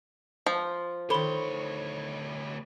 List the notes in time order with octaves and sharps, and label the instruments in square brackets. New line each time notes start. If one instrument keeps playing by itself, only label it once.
[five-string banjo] F3
[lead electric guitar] D2 C#5 [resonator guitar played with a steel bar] D#3 C5 [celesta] A4 B5 G7